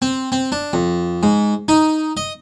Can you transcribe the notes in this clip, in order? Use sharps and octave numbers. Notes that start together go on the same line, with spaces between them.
C4
C4
D4
F2
G#2
D#4
D#5